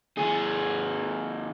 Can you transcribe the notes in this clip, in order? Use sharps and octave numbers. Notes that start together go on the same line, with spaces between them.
D#2 G#4